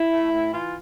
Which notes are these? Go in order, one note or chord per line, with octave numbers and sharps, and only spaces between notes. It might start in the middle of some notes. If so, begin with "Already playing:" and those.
Already playing: E4
A3
A2
E3 F4